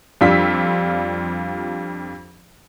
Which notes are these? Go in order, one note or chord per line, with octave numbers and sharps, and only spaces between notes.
F2 G3 D4 F4 E6 B6